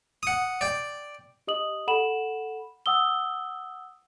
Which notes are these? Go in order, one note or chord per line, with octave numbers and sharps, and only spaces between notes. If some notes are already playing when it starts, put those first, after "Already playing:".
F#5 D#6
D5 G5
G4 D#5 D#6 F#7
A4 F#5 B5 E7 F#7
F#5 D#6 E6 G7